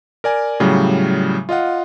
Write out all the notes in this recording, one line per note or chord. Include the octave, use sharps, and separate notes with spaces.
A#4 D5 G#5
A2 C#3 F#3 G3
F4 D#5 F5 F#5